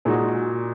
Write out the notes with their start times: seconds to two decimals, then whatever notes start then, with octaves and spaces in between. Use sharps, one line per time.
0.05 A#2 G#3 D#4 F#4